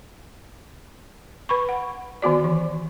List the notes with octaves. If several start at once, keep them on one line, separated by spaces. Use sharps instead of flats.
B4 B5 C#6
F#5
D#3 B3 F#4 D5
E3